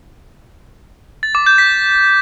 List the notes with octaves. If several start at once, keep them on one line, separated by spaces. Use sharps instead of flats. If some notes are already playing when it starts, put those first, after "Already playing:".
A6
D6
G6
B6